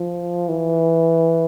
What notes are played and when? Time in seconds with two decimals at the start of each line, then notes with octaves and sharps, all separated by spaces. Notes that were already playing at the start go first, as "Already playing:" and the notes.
Already playing: F3
0.49 E3